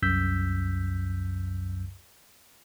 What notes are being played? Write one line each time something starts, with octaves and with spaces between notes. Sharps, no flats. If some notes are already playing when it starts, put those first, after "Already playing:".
C2 F#2 E6 G6 B6